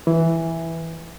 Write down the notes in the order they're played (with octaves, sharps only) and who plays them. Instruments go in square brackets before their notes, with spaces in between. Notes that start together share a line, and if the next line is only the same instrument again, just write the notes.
[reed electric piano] E3